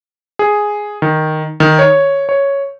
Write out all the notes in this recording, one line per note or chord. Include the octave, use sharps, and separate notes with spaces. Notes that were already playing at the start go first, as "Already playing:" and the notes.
G#4
D#3
D#3
C#5
C#5